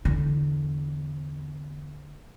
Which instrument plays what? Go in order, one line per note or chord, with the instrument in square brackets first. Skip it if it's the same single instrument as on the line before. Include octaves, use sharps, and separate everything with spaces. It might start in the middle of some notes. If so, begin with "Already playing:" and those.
[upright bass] E2 D3